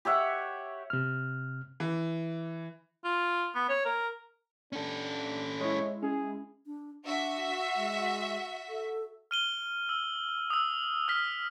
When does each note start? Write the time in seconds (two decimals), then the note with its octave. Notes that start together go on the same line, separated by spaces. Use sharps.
0.05 G4 C#5 E5 F#5
0.90 C3 F6
1.80 E3
3.04 F4
3.55 B3
3.69 C#5
3.85 A#4
4.73 C#4 D4 A4
5.60 G#3 E4 C#5
6.03 C#4 G#4
6.66 D4
7.05 D4 F#4 E5
7.76 G#3
8.69 A4
9.31 F6 D#7 G7
9.89 E6
10.50 D#6 E6
11.08 E6 F6 B6